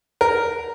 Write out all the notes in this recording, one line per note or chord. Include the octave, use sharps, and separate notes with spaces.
A#4